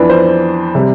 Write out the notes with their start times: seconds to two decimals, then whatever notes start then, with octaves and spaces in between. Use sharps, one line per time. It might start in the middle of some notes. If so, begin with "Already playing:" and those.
Already playing: F2 E3 B3 D4 B4
0.09 C5
0.75 C3 G3